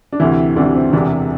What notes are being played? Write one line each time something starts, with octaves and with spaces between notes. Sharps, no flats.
D4
D2 C3 E3 E4
D2 C3 E3 D4
C4
E1 E2 C3 E3 D4